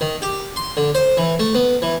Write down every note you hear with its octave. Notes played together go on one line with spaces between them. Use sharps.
D#3
G4
C6
D3
C5
E3
A3
B3
E3